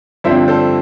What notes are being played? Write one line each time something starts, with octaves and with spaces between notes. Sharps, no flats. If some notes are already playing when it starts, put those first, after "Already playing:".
G2 D3 F3 C4 C5 E5
A4 C5